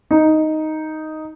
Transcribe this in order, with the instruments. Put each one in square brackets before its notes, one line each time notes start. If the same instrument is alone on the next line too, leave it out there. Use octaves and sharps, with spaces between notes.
[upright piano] D#4